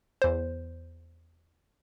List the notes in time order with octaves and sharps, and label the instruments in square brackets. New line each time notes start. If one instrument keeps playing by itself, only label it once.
[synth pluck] E2 C5